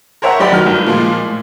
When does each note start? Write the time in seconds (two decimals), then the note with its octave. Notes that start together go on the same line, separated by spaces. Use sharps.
0.22 A#4 C5 C#5 E5 F#5 A#5
0.40 F#1 G4 D5 B5
0.52 F#3 D#4 A#4 F6
0.66 G1
0.86 A#2 F3 G#3
1.24 A2